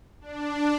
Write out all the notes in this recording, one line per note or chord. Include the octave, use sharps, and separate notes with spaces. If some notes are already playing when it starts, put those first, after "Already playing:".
D4